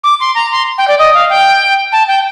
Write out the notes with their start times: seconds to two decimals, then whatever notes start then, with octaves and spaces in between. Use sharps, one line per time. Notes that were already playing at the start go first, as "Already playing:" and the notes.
0.03 D6
0.20 C6
0.35 A#5
0.51 C6
0.78 G5
0.87 D5
0.99 D#5
1.14 F5
1.29 G5
1.92 A5
2.08 G5